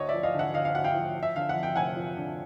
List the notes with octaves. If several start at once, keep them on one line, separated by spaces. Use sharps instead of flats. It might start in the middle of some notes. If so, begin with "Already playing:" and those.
Already playing: D2 C#5 D#5
F3 D5 E5
D#5 F5
D3
E5 F#5
D2 D#5 F5
F5
D2 F#5
F5 G5
F3
F3
E5
D3 F5
F#5
F2
G5
F1 F#5 G#5
F3
D3